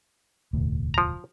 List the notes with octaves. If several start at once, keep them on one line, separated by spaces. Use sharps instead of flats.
E1 D2 A2
F3 A#5